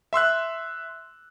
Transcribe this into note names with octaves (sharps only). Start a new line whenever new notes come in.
E5 C6 E6 F#6